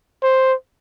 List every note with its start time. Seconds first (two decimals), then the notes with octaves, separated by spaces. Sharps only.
0.23 C5